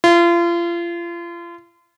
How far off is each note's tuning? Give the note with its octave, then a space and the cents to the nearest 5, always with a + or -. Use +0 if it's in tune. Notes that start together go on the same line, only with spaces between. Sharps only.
F4 -35